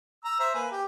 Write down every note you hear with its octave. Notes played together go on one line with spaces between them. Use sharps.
A#5 E6
C5 E5 A#5
A#3 B4 G#5
G4